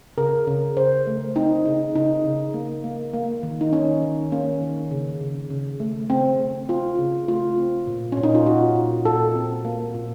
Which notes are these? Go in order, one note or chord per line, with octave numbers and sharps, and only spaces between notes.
C#3 A#4
C#3
C#3 C5
A3
C4 D#4
C#3 D#4
C#3 D#4
C#3
A#3
A#3
A#3
D#3
D#4
D#3 C#4
D#3
A#3 C#4
D#3
C#3
C#3
C#3
A3
C#3 C4
A3
C4 F4
C#3
A3 F4
C4
A#2
A#2 C#4
D#4
F4
A#2 F#4
A#2
A#2 A4
C4
A#3
A#2